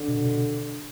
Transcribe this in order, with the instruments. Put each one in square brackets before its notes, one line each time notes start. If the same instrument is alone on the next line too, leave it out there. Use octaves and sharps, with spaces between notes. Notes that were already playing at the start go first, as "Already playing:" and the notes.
Already playing: [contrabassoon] D3
[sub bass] B2
B2